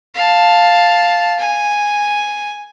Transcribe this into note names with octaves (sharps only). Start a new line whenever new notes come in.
F5 A5
G#5